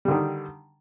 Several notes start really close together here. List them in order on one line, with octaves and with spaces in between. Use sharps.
G3 D3 D#3